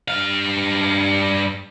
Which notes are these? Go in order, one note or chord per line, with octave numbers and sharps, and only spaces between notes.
G2 F5